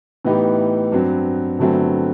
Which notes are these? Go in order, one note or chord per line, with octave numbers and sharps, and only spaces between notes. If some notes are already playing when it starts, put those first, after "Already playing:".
A2 E3 B3 D#4 G4
G2 F#3 C4
G1 G2 F#3 A3 C4